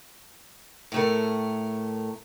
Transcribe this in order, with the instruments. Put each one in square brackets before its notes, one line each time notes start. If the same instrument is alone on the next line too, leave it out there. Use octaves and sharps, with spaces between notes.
[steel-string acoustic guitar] A2 A3 A#4